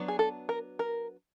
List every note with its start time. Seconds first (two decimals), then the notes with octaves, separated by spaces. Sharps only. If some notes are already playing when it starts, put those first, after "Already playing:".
Already playing: F#3 B3 D4
0.08 G#4
0.19 A4
0.49 A#4
0.79 A#4